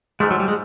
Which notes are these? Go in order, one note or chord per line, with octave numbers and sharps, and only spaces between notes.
G#2 F3 G#3 A3
F#3
G3
G#3